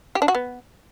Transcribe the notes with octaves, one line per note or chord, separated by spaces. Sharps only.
G4
D4
F#4
B3